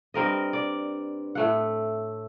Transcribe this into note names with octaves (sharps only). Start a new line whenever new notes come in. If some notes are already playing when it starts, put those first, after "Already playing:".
G2 C4 A#4 D#5
D5
A2 A3 F#5